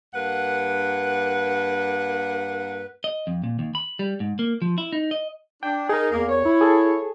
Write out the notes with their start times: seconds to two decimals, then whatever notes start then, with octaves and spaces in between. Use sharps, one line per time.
0.14 G2 A#3 B4 F#5
3.04 D#5
3.27 F2
3.44 A#2
3.59 D#2
3.75 B5
3.99 G3
4.20 G#2
4.39 A#3
4.62 F3
4.78 E4
4.93 D#4
5.11 D#5
5.63 D4 G5
5.89 D#4 G#4 A#4
6.11 E2 A#3
6.29 C#5
6.45 E4
6.61 G#4 A4